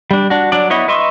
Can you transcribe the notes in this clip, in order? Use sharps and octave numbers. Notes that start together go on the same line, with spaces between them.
G3 D4
D4 F#4
F#3 D4 D5
B3 E4 C#5 D#5
B4 D#5 E5 C6 C#6